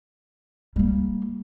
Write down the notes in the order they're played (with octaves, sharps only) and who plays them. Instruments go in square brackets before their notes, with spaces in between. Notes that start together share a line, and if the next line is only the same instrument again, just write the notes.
[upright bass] G3 A#3